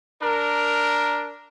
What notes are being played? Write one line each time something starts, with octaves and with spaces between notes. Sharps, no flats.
D4 A#4